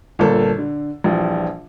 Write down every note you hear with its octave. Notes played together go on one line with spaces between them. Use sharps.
G1 A#2 A#3 A4 A5
D3
A#1 E3 F3 G3